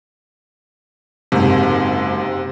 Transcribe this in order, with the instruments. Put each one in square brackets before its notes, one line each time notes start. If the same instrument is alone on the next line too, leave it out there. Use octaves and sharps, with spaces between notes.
[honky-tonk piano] F#1 G#2 [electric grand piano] C3